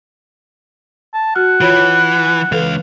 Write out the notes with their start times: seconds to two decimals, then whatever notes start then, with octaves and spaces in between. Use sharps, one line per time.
1.14 A5
1.36 F#4 F#5 F6
1.61 E3 F4 C#5 B5
2.52 C#2 E3 A4 B4 F5